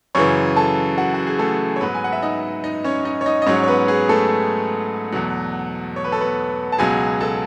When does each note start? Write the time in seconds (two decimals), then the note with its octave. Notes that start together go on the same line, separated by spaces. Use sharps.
0.15 F#2 C#3 E3 C#5 C#6
0.56 A4 A5
0.98 F#4 F#5
1.14 F#4
1.27 G#4
1.39 A3 A4
1.76 C#5
1.81 G#2 F#3 B3 B4
1.94 G#5
2.04 F#5
2.12 E5
2.22 D#4 D#5
2.64 D#4 D#5
2.84 C#4 C#5
3.05 D#4 D#5
3.21 C#5
3.26 D#4 D#5
3.42 D#5
3.46 G#2 F#3 C#4 C#5
3.63 C#5
3.68 B3 B4
3.88 G#4
4.09 A3 A4
5.12 E2 B2 F#3
5.96 C#5
6.04 B4
6.12 A4
6.21 B3 B4
6.72 A5
6.78 C#2 B2 F#3 G#4 G#5
7.20 A4 A5